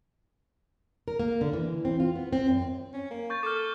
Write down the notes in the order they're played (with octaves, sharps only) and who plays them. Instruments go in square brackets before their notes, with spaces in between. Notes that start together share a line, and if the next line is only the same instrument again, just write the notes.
[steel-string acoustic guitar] A#4
A#3
D3
E3
C4
F4
B3
C4
F#2
[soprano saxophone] C#4
A#3
[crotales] C#6 G6 A6
[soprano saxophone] A4 [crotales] D6 F6